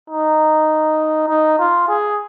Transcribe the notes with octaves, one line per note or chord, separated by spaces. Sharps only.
D#4
D#4
F4
G#4